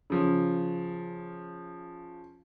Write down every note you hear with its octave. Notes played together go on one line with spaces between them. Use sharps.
C#3 F3